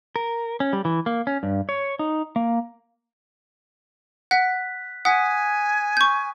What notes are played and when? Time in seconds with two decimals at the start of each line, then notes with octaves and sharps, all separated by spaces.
0.16 A#4
0.60 C#4
0.73 G3
0.85 E3
1.06 A#3
1.27 C#4
1.43 G2
1.69 C#5
1.99 D#4
2.36 A#3
4.31 F#5 F#6 B6
5.05 F#5 G#5 D#6 F#6 B6
5.97 C#6 G6